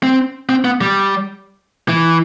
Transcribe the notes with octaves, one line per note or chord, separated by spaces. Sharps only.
C4
C4
B3
G3
E3